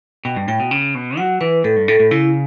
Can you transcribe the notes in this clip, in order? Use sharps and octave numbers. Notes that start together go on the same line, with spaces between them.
B2 G5
G2
A2 G5
B2
C#3
B2
F#3 F#5
E3 B4
A2 A4
G2
A2 A4
A2
C#3 E4